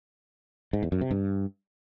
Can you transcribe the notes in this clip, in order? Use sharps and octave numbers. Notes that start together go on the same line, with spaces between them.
G#2
E2
F#2
C3
G2